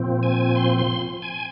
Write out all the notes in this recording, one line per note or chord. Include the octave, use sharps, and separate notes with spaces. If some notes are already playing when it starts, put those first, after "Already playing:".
Already playing: A#2 F3 C4
G#5
C6
C6
G#5